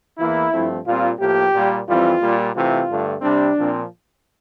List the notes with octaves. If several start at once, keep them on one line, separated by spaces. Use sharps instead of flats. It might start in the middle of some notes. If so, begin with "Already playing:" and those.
E2 E3 A#3 E4
G2 F3 A3 C4
A#2 G3 C4 F4
A2 F3 A#3 G4
A#2 G3 A#3
F2 E3 G3 C4 F4
A#2 G3 A#3
C3 E3 A3 C4 F4
G2 D3 A3
C3 G3 C4 D4
A#2 F3 C4